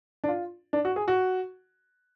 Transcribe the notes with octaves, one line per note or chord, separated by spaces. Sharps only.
D4
F4
D4
F#4
G#4
F#4